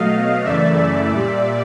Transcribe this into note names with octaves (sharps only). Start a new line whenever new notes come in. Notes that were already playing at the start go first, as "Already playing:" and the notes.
Already playing: B2 F#3 A3 D#5 F5
F#2 C#3 E3 A3 D5 E5
A#2 G3